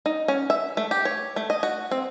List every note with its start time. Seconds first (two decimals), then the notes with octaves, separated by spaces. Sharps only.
0.06 D#4
0.28 C#4
0.50 E5
0.77 A3
0.91 G4
1.05 C#5
1.36 A3
1.50 D#5
1.63 F#4
1.91 C4